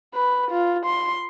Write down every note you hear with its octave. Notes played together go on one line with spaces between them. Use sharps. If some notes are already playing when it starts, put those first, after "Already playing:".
B4
F4
C6